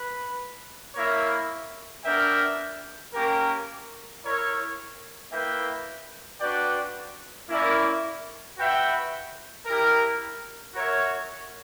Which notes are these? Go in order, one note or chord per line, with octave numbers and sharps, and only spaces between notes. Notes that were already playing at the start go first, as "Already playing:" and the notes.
Already playing: B4
A#3 E4 A#4 C#5 E5
B3 D4 A#4 E5 G5
A#3 C#4 G4 A#4
E4 A#4 C#5
A#3 E4 B4 E5 G5
D4 F#4 B4 D5 G5
A#3 C#4 E4 A#4 D5
F#4 B4 E5 G5
E4 G4 A#4
F#4 A#4 C#5 E5